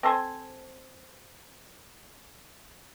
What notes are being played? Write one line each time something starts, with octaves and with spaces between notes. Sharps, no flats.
C4 A4 C5 G#5